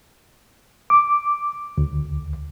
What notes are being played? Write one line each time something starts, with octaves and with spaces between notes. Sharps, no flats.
D6
D2